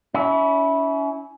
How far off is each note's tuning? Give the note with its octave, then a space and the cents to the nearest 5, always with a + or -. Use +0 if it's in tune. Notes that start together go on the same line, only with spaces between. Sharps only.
C#4 +35 E4 -15